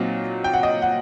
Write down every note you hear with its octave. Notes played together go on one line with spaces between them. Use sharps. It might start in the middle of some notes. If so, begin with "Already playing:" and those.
Already playing: A#2 F#3 C4 D#4
G5
F#5
D#5
F#5